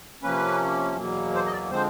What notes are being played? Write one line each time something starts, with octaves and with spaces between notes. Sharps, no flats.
C3 F3 A#3 C#4 B4
E2 B2 F#3 A#3
C5
D#5
D5
D3 F3 G#3 C4 C5